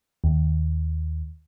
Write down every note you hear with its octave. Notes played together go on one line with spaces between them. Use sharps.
D#2